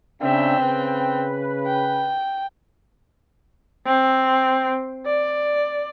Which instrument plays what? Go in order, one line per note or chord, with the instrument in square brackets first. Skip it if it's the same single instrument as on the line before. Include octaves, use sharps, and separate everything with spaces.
[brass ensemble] C#3 D4 E5 [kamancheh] C4 G5
[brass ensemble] C#3 B4
[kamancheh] G5
[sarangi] C4
D5